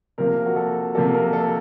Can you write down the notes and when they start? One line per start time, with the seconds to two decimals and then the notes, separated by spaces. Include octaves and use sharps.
0.18 C3 F3 A#3 A#4
0.46 F#4
0.56 A4
0.95 C3 F3 A#3 A4
1.14 A#4
1.33 A4